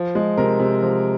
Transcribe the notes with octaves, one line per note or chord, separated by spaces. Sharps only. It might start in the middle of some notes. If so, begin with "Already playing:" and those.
Already playing: F3
G#3
C3 A#4
C3
F3